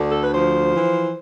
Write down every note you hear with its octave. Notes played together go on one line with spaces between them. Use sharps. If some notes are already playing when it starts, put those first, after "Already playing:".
Already playing: D2 D3
A4
B4
F3 C5
E3